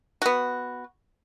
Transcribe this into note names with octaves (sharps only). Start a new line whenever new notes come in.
B3 F#4